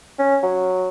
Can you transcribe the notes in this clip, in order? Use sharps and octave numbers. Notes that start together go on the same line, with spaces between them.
C#4
F#3